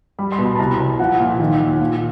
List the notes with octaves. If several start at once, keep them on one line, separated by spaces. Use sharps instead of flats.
G3 B5
C6
B2
B5
A5
C2 A#5
C2
F3 F#5
A#2
D#3
D#2
A#2